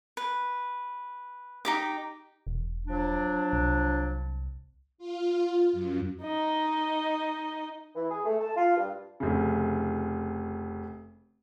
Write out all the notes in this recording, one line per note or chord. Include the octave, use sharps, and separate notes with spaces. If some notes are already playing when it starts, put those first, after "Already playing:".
B4
D#4 G4 D6
E1
F3 F#3 D4
C2
F4
F#2
D#4 D#5
E3
G#4
A3
A5
F4
G2
F1 C#3